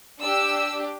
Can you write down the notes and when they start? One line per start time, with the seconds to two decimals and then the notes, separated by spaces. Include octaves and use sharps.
0.20 D4 G4 E6